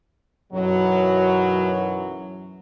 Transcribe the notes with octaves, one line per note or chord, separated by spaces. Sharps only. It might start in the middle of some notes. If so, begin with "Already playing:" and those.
B1 F#2 B2 E3 F#3